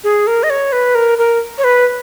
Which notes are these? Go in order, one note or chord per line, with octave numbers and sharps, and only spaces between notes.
G#4
A#4
D#5
C#5
B4
A#4
A#4
C#5
B4